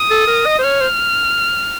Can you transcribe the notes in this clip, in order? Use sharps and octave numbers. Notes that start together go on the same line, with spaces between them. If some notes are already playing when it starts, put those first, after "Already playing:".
Already playing: D#6
A4
A#4
D#5
C5
C#5 F6
C5